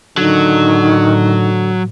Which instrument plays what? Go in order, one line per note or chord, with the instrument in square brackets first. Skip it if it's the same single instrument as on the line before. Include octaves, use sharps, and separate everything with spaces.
[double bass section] A2 [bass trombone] D3 [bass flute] D#3 [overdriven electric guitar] F#3